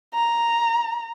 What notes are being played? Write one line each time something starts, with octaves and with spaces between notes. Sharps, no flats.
A#5